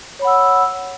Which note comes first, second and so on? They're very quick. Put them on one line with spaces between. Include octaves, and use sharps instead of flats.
C#5 B5 F#5 E6